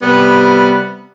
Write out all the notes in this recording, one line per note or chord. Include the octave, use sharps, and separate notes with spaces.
C3 G3 B3